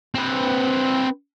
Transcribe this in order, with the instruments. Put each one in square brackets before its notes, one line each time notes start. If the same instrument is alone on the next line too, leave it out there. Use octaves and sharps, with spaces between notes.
[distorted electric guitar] C4 B4